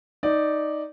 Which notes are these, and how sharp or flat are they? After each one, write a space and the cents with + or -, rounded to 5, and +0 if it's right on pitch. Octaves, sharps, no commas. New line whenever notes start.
D#4 +0 D5 +0